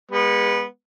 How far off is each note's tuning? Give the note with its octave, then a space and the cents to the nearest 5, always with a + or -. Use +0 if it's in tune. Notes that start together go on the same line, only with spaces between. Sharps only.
G#3 -35 B3 -20